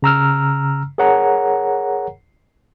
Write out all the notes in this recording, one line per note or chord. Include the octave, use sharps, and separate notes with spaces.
C#3 A#5 E6 F6
G#4 A#4 C#5 F#5 A#5